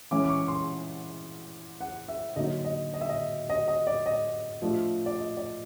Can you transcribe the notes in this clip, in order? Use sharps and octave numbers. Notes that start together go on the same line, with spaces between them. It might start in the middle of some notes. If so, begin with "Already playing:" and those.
E3 G#3 C#4 E4 D6
D6
C#6
C6
F#5
E5
D3 F#3 A#3 D#4 D#5
D#5
D#5
E5
D#5
D#5
D#5
D5
D#5
F3 A3 D4 F4
D5
D#5
D5